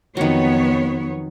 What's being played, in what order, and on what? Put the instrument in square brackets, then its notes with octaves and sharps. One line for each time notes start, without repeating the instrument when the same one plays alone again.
[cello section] F2 B3 C#5 [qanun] D#3 F#3